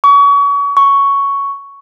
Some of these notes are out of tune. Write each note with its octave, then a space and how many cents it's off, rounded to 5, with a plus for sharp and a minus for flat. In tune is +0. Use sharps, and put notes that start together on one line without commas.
C#6 +35
C#6 +5